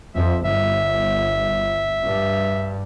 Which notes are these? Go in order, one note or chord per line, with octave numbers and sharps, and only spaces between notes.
F2 E5
G1 E5
G2